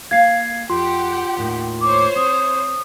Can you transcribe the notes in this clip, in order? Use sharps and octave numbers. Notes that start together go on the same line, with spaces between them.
A#3 F5 G#6 C7
F2 F4 G4 F#5 C6
D#2 A2 D#3
C5 C#5 D6
C4 D#6